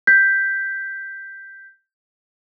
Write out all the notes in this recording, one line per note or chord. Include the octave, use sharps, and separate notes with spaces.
G6 B6